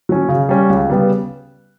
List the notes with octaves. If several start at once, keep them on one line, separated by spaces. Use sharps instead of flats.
F#3 C#4
C#3
G3 C#4
C#2
C#3 G3 B3